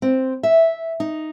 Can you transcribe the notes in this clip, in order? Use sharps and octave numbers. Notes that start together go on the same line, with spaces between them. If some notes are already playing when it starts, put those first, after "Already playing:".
C4
E5
D#4